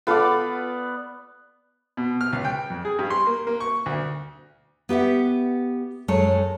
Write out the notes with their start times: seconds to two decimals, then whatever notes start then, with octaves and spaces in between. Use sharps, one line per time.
0.07 B3 F4 A4 D5 F5
1.97 B2
2.21 F6
2.33 C#2
2.45 G5
2.70 F2
2.85 G#4
2.99 G2
3.10 C6
3.27 A#3
3.47 A#3
3.60 C#6
3.86 D2
4.89 B3 G4 E5 F#5
6.08 F#2 G#3 A3 C#5 A5